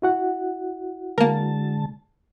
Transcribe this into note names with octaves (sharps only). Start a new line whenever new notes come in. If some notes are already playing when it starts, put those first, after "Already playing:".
E4 F#4 F#5
D3 G#3 A#3 A#4 A5